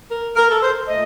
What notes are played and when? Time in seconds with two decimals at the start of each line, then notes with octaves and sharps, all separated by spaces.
0.11 A#4
0.36 A#4
0.49 A4
0.62 C5
0.87 A#2 A3 D#5